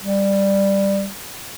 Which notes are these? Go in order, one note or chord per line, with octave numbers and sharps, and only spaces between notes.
G3